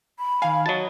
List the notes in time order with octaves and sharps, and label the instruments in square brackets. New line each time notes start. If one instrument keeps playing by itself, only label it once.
[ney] B5
[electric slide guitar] D#3 G#5 [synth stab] F5
[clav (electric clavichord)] F#3 A5 [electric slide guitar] F#4 C#5 D#5